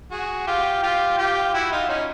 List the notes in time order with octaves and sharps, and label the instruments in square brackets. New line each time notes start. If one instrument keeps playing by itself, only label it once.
[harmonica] F#4 G#4
F4 G4
F4 G4
F4 G4
E4 F#4
D#4 F4
C#4 D#4